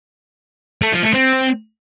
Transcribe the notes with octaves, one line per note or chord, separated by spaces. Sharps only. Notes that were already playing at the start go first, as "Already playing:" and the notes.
A3
F3
A3
C4